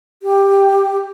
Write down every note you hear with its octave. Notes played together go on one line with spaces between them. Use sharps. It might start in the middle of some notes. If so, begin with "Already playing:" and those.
G4